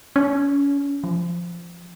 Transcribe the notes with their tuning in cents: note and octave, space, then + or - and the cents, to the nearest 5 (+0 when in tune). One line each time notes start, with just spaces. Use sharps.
C#4 +30
F3 -15